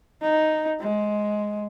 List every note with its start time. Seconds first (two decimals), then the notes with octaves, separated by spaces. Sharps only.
0.22 D#4
0.81 G#3